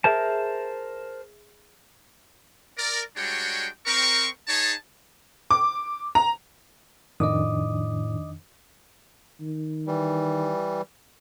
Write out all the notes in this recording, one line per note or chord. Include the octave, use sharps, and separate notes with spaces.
G#4 A#4 C5 E5 A5
A#4 D5
G3 G#3 D4 F#4 C#5 G5
C4 A#4 C#6
D#4 G#4 C#5 A5
D6
A#5
F2 A2 D#3 D4 D#5 D6 D#6
D#3
E3 G3